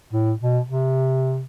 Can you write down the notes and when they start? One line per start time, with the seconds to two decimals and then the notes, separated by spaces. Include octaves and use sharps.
0.13 A2
0.40 B2
0.68 C3